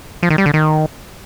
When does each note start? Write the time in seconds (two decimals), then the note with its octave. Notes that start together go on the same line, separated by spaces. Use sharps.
0.23 F3
0.30 D#3
0.38 G3
0.46 D3
0.54 D#3